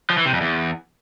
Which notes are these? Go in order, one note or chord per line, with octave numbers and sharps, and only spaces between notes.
F3
E3
C3
F2
E2